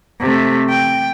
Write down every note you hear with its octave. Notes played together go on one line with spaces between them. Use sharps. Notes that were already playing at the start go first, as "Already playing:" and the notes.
C3 A3
G5